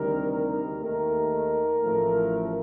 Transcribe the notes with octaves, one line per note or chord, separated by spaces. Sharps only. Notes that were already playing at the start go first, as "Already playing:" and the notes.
Already playing: D2 C3 D#3 G3 A#4
A#4
D#2 D#3 A3 A#4
A1 A2 F3 A3